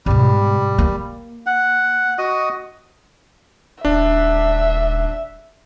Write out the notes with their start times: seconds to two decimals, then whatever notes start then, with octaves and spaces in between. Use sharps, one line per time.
0.06 G#2 B2 G3
0.78 A#3
1.46 F#5
2.19 F#4 D#5 D#6
3.85 D#1 D4 E5